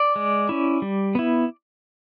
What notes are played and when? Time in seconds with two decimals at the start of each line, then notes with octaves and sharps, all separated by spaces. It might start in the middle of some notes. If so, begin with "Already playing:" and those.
Already playing: D5
0.16 G#3
0.49 C#4 E4
0.82 G3
1.15 B3 E4